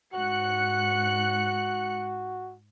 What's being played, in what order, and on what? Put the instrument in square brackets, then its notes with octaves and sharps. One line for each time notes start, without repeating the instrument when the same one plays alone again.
[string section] G#2 F#6 C#7 [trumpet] F#4